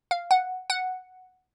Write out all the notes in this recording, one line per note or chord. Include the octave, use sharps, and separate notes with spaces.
F5
F#5
F#5